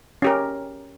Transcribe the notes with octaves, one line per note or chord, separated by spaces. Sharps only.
C#4 G4 A#4